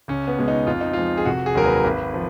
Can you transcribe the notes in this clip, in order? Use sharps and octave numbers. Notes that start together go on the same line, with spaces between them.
C#2 C#4
B3
B2 G#3
D#4
F2 F4
D#4
F3 G#3 F4
G#4
F1 F#4
G#4
D#2 D#3 F#3 A#4
B4
G#1
F3